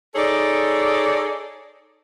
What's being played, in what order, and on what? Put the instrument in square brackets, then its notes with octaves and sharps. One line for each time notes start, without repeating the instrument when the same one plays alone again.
[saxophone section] D#4 G#4 A4 C#5 D5